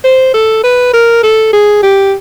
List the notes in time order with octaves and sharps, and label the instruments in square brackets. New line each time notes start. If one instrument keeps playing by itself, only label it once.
[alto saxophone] C5
A4
B4
A#4
A4
G#4
G4